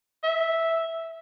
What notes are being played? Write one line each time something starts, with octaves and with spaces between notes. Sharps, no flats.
E5